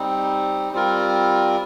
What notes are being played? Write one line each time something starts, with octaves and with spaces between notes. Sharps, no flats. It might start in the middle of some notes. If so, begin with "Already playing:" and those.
Already playing: G3 C4 D#4
G3 C4 F4 A#4